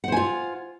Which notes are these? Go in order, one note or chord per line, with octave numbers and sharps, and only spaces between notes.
F4 C5 F#5 G#5